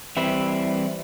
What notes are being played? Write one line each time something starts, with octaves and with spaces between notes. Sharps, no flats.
E3 G3 C4 E4